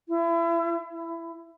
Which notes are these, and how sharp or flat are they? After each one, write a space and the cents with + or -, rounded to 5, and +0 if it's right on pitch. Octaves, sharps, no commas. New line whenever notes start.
E4 +30
E4 +20